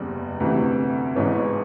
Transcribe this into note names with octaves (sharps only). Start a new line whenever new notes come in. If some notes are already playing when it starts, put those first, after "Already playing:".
Already playing: F#1 E2 C#3 G3
D2 C3 E3
A1 G#2 E3 B3 C#4